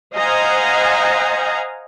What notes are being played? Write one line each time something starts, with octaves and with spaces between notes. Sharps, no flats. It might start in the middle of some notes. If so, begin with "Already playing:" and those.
C5 D#5 F5 F#5 G#5 A#5